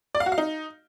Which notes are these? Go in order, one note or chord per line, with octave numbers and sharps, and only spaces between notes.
D5
F5
F#4
F5
D#4